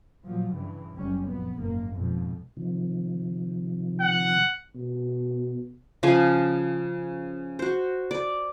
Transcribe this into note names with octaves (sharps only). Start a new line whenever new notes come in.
A#2 F3 F#3
G2 C#3 E3
F#1 C#2 F#2 G3 C#4
A#1 F2 B3
F#1 G#2 A#3
F2 G#2 B2
C3 D#3 F3
F#5
B2
C#3 F3 F5 G#5
F#4 C5
D5